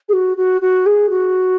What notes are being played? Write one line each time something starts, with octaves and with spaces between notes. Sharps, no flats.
G#4
F#4
F#4
F#4
G#4
F#4